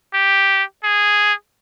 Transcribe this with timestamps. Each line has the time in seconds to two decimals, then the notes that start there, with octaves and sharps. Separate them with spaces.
0.14 G4
0.84 G#4